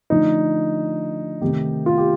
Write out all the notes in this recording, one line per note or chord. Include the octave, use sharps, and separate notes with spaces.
D3 F3 A3 D#4
C3 D#3 A3 G4
F4
G4